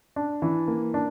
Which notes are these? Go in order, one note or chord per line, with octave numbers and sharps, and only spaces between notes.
D4
E3
A#3
D4